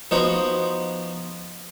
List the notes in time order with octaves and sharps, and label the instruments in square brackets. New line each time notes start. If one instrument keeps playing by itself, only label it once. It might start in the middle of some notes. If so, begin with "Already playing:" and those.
[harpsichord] F3 B3 D#4 F#4 C5